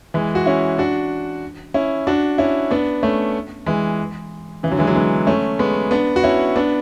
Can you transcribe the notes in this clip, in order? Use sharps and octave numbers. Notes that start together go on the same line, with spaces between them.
E3 G#3
F#4
C#4 E4
D4 F#4
C#4 E4
D4 F#4
C#4 E4
B3 D4
A3 C#4
E3 G#3
C#3 E3
D3 F#3
E3 G#3
D3 F#3
G#3 B3
A3 C#4
G#3 B3
B3 D4
F#4
C#4 E4
B3 D4